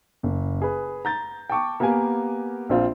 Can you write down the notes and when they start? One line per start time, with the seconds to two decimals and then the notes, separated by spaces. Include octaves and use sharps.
0.23 F#1
0.62 G#4 B4
1.05 A#5 G6 A6
1.50 G5 A5 C#6 D6
1.80 A#3 B3 G4 A#4 G#5
2.69 A#1 C4 F4